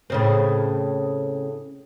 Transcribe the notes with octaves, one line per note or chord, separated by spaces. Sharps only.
A2 C#3 C4